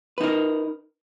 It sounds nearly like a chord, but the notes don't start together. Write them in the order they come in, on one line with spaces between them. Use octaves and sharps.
B4 D#4 A#4